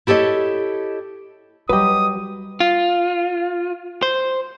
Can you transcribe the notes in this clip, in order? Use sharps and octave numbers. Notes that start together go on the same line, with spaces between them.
E4 G4 A4 C#5 D#5
F#3 G3 G4 B4 D#5 D#6
F4
C5